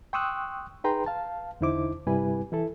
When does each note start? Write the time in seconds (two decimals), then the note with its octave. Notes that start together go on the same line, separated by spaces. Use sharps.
0.13 G5 C6 C#6 D#6 E6 F#6
0.84 D#4 G#4 B4 G5 A#5 C6
1.06 F5 A5
1.61 E2 D3 D#4 E4 C5 D6
2.07 G2 C3 G3 E4 B4 G#5
2.52 E3 E4 A4